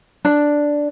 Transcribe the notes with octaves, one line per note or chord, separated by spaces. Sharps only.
D4